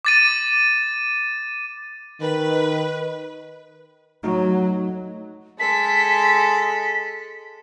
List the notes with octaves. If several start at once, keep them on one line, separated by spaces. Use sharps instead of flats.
D6 A6 D#7
D#3 B4
F#3 A3 D#4 F#4
G#3 A4 B6